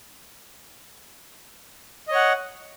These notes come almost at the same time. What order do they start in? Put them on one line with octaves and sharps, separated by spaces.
D#5 C#5 F#5